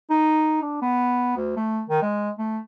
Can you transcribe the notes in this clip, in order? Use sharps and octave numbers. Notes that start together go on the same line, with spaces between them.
D#4
D4
B3
D2
A3
D#3
G#3
A3